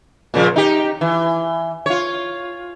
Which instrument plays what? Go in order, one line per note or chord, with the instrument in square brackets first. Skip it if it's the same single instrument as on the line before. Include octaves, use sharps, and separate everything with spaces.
[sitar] A#2 C#3 F3
D#4 G4
E3
F4 C#5